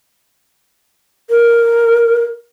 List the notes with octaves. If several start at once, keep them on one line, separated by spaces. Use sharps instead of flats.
A#4